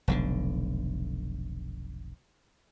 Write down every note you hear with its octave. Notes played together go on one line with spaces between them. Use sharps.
F1 B1 D3